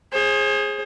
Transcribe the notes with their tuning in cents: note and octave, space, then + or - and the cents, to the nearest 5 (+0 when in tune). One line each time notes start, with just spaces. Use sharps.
G#4 +0 C5 +35